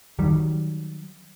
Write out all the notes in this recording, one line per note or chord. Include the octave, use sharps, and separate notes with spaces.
D#3 F#3 G3